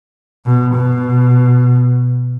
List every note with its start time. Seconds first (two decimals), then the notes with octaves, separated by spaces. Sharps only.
0.46 B2
0.74 B2